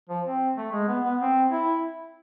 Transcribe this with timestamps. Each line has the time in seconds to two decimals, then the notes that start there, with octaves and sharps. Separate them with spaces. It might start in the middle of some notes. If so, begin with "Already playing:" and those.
0.09 F3
0.26 C4
0.57 A3
0.73 G#3
0.88 B3
1.04 B3
1.21 C4
1.52 E4